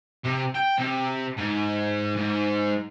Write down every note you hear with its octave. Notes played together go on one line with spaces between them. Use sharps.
C3
G5
C3
G#2
G#2